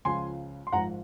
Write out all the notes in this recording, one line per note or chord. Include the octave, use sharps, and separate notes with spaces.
C#2 C#3 F3 G#5 C6
C6
G#1 G#2 F3 F#5 A#5